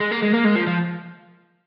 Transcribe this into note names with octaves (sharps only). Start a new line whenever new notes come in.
G#3
A#3
G#3
A#3
G#3
F3
F3